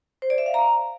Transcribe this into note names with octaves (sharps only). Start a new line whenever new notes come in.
C5
D5
E5
F5
A#5